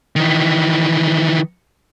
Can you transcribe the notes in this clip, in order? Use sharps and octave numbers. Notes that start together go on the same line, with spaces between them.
D#3 E3